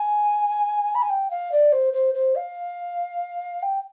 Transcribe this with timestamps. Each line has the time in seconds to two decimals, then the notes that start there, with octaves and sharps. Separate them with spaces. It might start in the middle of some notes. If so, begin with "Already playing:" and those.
Already playing: G#5
0.95 B5
1.03 G#5
1.10 G5
1.31 F5
1.52 D5
1.72 C5
1.94 C5
2.15 C5
2.36 F5
3.63 G5